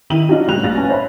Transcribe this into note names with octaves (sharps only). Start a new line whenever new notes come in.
D#3 E4 D#7 F#7
F#3 D4 D#4 F4
A2 C#3 F#3 G3 F#6 F7
A#1 A6 A#6
C#4 B4 G#5
C5 C#5 E5 B5